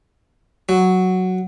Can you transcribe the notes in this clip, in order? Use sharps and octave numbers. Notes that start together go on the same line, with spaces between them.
F#3